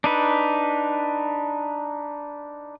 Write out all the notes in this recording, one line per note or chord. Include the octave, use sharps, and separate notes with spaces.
D4 D#4 B4